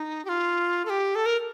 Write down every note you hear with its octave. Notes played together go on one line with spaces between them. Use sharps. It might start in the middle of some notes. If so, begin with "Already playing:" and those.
Already playing: D#4
G4
F4
A4
G4
A4
A#4